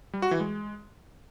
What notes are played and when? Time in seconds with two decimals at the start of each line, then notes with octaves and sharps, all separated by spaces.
0.14 G3
0.22 F#4
0.31 E3
0.40 G#3